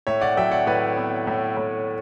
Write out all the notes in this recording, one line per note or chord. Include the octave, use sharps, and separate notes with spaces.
A2 C#5 E5
D5 F#5
F#3 E5 G5
D5 F#5
A2 B4 D5
B3
A2
A2